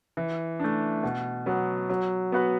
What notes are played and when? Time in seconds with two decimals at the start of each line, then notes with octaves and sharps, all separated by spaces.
0.17 E3
0.60 A3 D4
1.03 B2
1.46 F#3 B3
1.89 F#3
2.32 B3 F#4 B4